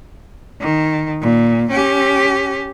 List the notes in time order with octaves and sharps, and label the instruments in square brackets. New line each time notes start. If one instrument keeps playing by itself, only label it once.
[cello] D#3
A#2
C#4 G4